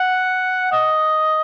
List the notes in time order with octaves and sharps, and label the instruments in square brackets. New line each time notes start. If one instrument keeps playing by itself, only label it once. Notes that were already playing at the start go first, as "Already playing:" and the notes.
Already playing: [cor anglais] F#5
D#5